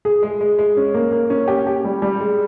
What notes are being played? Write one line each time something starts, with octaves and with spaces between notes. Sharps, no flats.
G#4
G#3
G#3
G#3
C#4
A#3
A#3
C#4
G4
G4
G3
G3
G#3